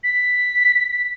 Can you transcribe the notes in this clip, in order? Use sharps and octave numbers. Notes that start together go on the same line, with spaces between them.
B6